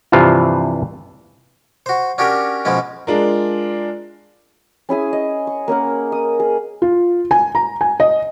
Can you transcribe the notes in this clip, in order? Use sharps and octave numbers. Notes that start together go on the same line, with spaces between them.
G2 C3 E3 F3 F4
F#4 C5
C#4 D4 F#4 G4 A#4
F2 B2 F3 G#3 C#4
G#3 D4 F4 A#4
C#4 E4 G#4 G#5
D#5
C#6
A#3 C#4 A#4 F#5
D#6
G#4
F4
G#5
A#5
G#5
D#5